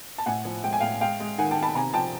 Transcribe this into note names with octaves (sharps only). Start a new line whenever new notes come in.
A5
A2 F#5 G#5
F3
G#3 G5
G#5
A2 F5 G5
G#3 F5 G5
G#3
D#3 F#5 G#5
G5 A5
D#3
A5 B5
C3 G#5 A#5
F3 G5 A5